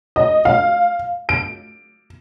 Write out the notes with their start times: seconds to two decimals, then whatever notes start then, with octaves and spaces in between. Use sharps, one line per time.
0.16 D#5
0.45 F5
1.29 D7